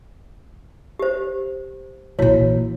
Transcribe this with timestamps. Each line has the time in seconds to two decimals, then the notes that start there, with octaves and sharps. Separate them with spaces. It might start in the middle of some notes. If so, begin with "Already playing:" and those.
0.99 G4 C5
2.19 A#1 E3 E4 F#4 C#5